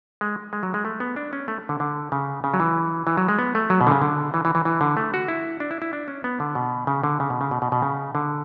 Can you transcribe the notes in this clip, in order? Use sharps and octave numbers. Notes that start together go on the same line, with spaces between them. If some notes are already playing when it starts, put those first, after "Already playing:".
G#3
G#3
F#3
G#3
A3
B3
D4
C#4
A3
D3
D3
C#3
C#3
F#3
E3
E3
F#3
G#3
B3
A3
F#3
B2
D3
C#3
D3
E3
E3
E3
E3
D3
A3
F#4
E4
D4
E4
E4
D4
C#4
B3
D3
B2
C#3
D3
C#3
B2
C#3
B2
B2
B2
C#3
D3